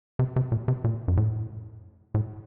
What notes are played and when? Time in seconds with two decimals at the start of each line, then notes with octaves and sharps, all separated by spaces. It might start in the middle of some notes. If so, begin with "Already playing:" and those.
0.19 C3
0.36 C3
0.52 A#2
0.68 C3
0.84 A#2
1.08 F#2
1.17 A2
2.14 A2